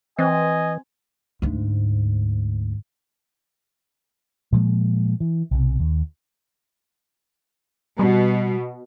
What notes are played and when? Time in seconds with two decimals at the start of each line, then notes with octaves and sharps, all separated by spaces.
0.19 E3 C4 D#5 G#5
1.42 D2 G#2
4.52 A#2 F3 G#3 A#3
5.20 E3
5.51 B1 C3
5.79 D#2
7.99 B2 G3